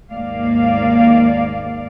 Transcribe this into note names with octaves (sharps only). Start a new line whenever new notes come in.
D#2 G#2 A#3 D5 F5